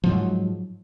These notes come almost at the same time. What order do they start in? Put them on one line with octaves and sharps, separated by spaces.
F3 G#2 F#3